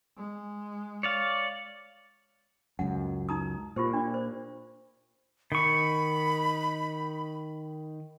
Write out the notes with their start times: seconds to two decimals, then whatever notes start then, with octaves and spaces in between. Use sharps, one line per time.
0.17 G#3
1.03 C#5 D5 F5
2.79 C#2 F#2 F#5
3.29 D#4 A#5 D#6
3.76 A#2 F4 G4 C5
3.93 D4 F4 D5
4.14 C5
5.52 D#3 B5 C#6